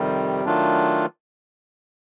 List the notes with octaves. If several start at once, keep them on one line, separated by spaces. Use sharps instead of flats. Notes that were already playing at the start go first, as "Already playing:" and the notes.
Already playing: F2 C3 D#3 G3
D#3 F#3 A3 D4 F4